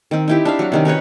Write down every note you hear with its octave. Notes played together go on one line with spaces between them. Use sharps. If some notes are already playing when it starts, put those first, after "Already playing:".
D#3 C4
D#4 E4 G4
D4 E5 F5
F#3 F#4
C3 D#3 C#4
C#4 D#4 B4 C#5